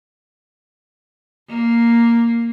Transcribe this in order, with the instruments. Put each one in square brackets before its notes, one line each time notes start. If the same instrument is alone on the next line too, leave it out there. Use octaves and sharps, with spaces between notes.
[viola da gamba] A#3